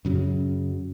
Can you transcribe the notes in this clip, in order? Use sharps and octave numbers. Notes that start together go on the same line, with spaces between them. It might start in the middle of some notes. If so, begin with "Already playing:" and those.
F#2 C#3 F#3